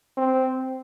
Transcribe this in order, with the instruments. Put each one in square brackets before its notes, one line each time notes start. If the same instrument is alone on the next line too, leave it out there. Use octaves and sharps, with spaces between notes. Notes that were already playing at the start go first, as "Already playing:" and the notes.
[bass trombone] C4